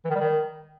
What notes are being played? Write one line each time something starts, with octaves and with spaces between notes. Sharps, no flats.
E3
D#3
G3
D#3